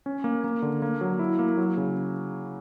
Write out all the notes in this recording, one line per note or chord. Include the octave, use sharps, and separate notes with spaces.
C#4
A#3
A#3
D3
A#3
F#3
E4
A#3
F#3
C#3